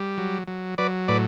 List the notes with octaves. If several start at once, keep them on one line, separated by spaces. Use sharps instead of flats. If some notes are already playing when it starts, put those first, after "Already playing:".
Already playing: G3
F#3
F#3
F#3 B4 D5
A2 B4 D5